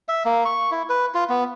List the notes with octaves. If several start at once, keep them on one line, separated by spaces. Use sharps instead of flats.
E5
A#3
C#6
E4
B4
F4
B3